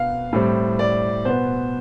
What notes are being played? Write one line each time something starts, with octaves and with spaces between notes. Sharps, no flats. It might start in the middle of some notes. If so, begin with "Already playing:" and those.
Already playing: B2 B3 F5
A2 G3 C4
D5
B2 B3 C5